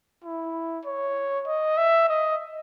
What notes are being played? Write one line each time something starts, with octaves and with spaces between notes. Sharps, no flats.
E4
C#5
D#5
E5
D#5